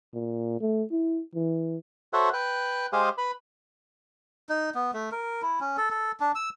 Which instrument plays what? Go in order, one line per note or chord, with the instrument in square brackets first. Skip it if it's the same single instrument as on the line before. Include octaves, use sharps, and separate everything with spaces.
[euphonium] A#2
A3
E4
E3
[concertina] F#4 A4 C5 C#5 E5 F#5
B4 G5 F#6
G#3 G4 G#4 C5 F5
B4 B5
[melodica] D#4
B3
A3
A#4
E4
C#4
A4
A4
D4
E6